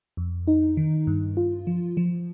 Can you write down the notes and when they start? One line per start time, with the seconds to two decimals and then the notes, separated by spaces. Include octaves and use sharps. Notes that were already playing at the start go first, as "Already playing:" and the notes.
0.17 F2
0.48 D#4
0.77 D#3
1.07 G2
1.37 F4
1.67 F3
1.97 F3